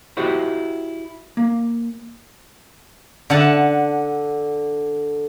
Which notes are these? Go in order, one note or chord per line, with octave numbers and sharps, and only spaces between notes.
E4 F#4 G4 C5 F#5
A#3
D3 F#5 A5